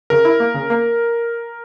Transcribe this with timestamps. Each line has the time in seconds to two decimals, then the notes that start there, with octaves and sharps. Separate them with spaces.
0.10 C#3 A#4
0.25 E4
0.40 A#3
0.55 C#3
0.70 A#3